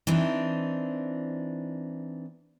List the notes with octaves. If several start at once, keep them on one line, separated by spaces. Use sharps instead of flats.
E3 C4 D4 D#4